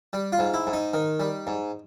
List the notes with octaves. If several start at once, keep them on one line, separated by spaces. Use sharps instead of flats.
G3
F4
G#2
E4
G#2
D#4
D#3
G3
G#2